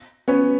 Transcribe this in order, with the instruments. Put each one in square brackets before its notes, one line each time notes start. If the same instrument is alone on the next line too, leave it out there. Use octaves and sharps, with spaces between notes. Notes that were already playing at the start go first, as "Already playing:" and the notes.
[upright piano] B3 C#4